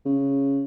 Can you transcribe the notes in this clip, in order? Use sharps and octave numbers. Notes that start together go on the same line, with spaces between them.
C#3